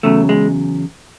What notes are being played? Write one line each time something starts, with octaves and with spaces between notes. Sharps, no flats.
E2 C#3 F#3 A3
G#3